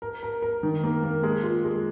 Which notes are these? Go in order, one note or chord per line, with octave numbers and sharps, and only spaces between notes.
A#4
A#4
A#4
D#3
A#3
A#3
G#3
F4
G#3